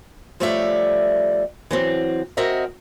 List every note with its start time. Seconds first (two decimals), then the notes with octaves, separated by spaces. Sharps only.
0.40 F3 G3 A3 C#5 D5 E5
1.71 E3 F#3 C4
2.37 C4 F#4 A#4 D#5 E5